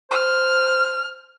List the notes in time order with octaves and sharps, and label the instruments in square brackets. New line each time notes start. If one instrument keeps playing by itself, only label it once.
[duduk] C5 [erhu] F6